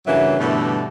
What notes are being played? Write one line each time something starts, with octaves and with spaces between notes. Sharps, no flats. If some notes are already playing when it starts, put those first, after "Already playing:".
G2 C#3 E3 F#3 A#3 E5
G2 B2 D3 E3 A3